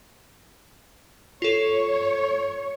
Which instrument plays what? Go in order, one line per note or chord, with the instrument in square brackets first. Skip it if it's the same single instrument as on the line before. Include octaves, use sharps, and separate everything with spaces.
[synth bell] F4 A4 [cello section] C#5